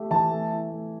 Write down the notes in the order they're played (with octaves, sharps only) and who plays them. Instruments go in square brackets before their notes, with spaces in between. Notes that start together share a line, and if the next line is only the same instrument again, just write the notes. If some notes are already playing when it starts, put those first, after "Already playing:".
Already playing: [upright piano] A3 G4
[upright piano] E3 [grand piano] A5
[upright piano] A3
E4
A3